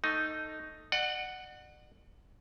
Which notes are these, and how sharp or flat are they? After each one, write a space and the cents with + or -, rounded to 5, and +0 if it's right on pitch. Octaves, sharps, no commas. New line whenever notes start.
A3 +10 D#4 +0
D5 +45 F#5 +0